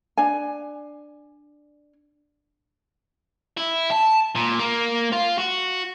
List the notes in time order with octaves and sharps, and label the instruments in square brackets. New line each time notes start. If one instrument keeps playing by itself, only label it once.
[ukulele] D4 G#5
[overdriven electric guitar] E4
A5
A#2
A#3
F4
F#4